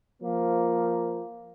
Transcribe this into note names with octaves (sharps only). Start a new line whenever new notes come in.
F3 A#3